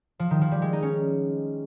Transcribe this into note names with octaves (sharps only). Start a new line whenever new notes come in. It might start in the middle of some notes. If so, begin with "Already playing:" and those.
F3
D#3
F3
G3
G#3
D#4
C#4